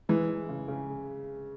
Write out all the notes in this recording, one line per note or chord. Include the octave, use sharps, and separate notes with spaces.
E3 G#3
G#3
C#3
C#3